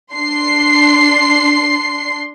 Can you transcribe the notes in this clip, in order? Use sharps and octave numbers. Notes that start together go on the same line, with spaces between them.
D4 C6 C7